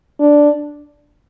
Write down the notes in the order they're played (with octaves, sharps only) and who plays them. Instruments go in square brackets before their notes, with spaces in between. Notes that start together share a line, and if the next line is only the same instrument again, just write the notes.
[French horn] D4